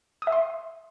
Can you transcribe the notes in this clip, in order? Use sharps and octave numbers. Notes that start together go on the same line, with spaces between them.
D#6
E5
C6